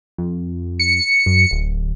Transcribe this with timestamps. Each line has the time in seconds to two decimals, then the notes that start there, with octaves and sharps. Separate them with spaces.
0.18 F2
0.79 C#7
1.26 F#2
1.51 D1